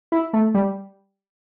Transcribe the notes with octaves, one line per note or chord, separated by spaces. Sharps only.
E4
A3
G3